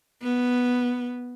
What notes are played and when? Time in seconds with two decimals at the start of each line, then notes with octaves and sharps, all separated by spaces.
0.22 B3